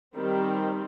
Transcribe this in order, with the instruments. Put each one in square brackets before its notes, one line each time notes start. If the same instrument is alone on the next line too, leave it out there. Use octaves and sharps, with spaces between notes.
[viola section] D#3 G3 C4 G4